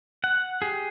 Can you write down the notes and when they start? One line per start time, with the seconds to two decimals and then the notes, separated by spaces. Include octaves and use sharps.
0.24 F#5
0.62 G4 G#4